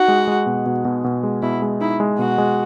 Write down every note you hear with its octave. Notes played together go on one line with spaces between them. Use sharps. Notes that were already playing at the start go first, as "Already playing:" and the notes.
Already playing: D#4 F#4
G#3
G#3
B2
B2
B2
B2
G#3
B2 E4
G#3
D#4 E4
G#3
B2 F#4
G#3